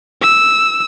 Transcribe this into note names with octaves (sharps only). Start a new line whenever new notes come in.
E6